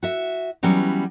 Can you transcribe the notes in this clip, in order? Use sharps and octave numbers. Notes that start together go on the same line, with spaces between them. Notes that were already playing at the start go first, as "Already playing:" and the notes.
F#4 E5
E3 F#3 G3 B3 C#4